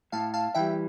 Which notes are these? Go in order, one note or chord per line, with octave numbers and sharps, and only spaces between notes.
A2 F5 A5
F5 A5
E3 G3 E5 G5